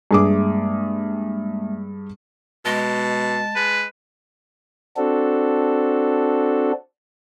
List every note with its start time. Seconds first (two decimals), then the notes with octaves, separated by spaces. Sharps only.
0.11 G2 G#3 A#3 G#4 E5 D6
2.66 B2 G#3 A5
3.56 G#3 B4
4.97 C4 D4 F#4 A4